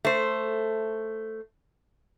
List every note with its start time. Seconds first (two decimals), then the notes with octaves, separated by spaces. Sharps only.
0.05 A3 C5